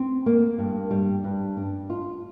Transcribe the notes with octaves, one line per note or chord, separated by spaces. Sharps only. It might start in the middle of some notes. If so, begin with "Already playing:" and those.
Already playing: C4
A#3
G2
G3
G2
D4
F4